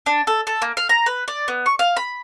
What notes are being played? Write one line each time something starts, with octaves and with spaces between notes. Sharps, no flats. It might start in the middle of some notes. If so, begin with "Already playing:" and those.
D4
A4
A4
A#3
F5
A#5
B4
D5
B3
C#6
F5
B5